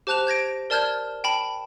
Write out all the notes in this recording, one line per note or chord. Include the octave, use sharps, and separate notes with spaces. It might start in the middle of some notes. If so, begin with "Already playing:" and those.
G4 C5 A5 F#6 E7 F7
G6 G#6 A#6 D7
A#4 D5 A5 F6 G6 G#6
G5 A5 B5